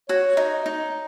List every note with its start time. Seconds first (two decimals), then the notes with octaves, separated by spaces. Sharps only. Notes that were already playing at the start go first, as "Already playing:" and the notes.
0.09 F#4 C#5
0.37 D#4
0.66 D#4